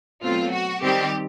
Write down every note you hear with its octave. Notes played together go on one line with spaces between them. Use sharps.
B2 F#3 A3 C4 F4
F#4
D#3 G3 C4 G4